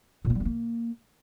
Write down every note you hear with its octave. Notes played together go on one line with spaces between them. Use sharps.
A#2
A#3
G3
B3
A#3